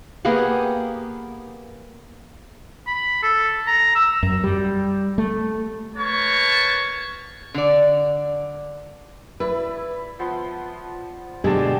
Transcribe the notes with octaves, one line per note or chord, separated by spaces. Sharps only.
A#3 B3 G4 G#4
B5
A4
A#5
E6
F#2
G3
A3
A#3 B4 C#5 A5 C#6
D3 D5
E4 B4 D5
F3 B3 C6
B2 D3 G#3 G4 G#5 A5 C6